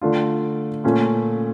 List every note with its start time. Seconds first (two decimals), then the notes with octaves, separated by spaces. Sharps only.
0.01 D3 A3 D4 F4
0.84 A#2 A3 C#4 F4